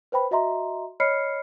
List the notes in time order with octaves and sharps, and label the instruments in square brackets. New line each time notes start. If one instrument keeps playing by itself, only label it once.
[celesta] B4 C5 G5 B5
F#4 D#5 E5 A#5 C6
C#5 D#5 B5 F6 C7 C#7